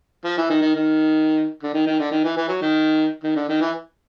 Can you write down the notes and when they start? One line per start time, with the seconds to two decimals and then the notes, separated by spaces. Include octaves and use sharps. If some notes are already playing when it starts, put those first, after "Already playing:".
0.25 F3
0.38 E3
0.50 D#3
0.62 D#3
0.75 D#3
1.63 D3
1.74 D#3
1.87 D#3
2.00 D3
2.12 D#3
2.24 E3
2.37 E3
2.49 F#3
2.62 D#3
3.23 D#3
3.36 D3
3.49 D#3
3.61 E3